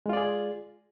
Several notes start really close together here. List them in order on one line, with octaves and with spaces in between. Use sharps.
G#3 F4 D5 G#4